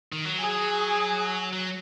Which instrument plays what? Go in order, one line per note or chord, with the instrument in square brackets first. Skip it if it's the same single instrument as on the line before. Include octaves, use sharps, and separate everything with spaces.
[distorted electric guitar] D#3
F#3
[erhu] G#4
[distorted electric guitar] F#3